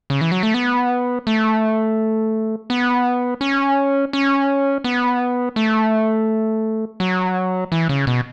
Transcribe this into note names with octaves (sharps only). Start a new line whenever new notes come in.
C#3
E3
F#3
A3
B3
A3
B3
C#4
C#4
B3
A3
F#3
E3
C#3
B2